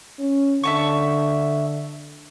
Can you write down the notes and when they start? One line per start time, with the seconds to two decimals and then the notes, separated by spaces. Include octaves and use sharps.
0.19 C#4
0.64 D3 E5 A5 C#6